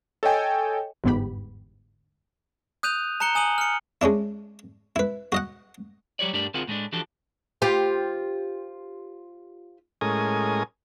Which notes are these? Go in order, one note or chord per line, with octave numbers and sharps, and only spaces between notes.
A4 C#5 D#5 G5 G#5
G1 E2 G#2 B3 G4 B5
D#6 F#6 G6 D#7 F7
A5 A#5 F#6 C#7 G7
G#5 D#6 D#7 F#7
F6 C#7
G#3 C#4 D4 E4
E4 B4
F#4 D#5 F#5
F#3 G3 G4 C#5 D5
G2 A3 D4 G4 A#4 D5
D2 C4 F4 G#4 A#4 F#5
A2 G#3 A3 D4
E3 F3 D4 F#4 G4 A4
F4 G4 C5
A2 G#3 C#4 A#4 G#5 D#6